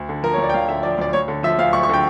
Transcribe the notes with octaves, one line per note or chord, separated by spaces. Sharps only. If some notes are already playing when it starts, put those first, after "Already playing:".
Already playing: D2
D3
F3 A#4
C#5
D2
D5
G5
D2 F5
D3 E5
F3 D5
D2 D5
D2 C#5
D3
F3 E5
D2 F5
D2 C#6
C#6
D3 G5